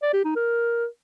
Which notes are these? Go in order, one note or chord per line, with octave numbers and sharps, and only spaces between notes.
D5
G4
D#4
A#4